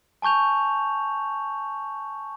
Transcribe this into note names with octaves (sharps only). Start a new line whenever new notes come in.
G#5 A5 C#6 G6 F7